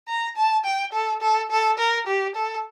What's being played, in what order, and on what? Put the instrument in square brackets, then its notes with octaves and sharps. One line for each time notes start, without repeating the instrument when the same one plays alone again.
[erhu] A#5
A5
G5
A4
A4
A4
A#4
G4
A4